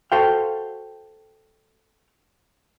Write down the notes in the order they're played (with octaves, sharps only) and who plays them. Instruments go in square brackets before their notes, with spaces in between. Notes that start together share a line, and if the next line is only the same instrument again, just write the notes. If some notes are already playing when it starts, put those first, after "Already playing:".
[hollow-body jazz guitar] F#4 A4 C5 F5 G5